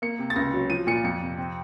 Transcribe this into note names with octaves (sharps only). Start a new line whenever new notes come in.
A#3 C#7
C3
A6
C#2 A#6
F#3
F3 D#7
A#2 C#7
F2 C#7
C3
C4